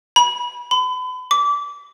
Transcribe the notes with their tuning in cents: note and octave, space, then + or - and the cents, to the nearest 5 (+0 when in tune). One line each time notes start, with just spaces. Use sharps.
B5 -30
B5 +35
D6 -25